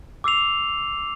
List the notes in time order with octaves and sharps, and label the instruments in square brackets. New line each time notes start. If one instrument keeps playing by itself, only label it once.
[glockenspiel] D6 E6 C7 F7